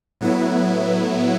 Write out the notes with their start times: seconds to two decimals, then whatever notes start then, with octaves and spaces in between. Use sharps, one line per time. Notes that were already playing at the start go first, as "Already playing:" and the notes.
0.21 A2 F#3 B3 E4